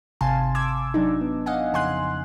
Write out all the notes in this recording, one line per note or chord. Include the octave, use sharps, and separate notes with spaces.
G#1 C3 F5 G#5 A5 C6
D6 E6 G#6
F#3 D4 D#4
B3
D#5 F5 F#5 G#5
F2 C#3 G#5 C6 F#6